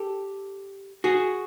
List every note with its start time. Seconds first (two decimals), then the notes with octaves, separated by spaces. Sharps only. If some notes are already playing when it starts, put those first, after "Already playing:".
Already playing: G4 A4
1.04 F#4 G#4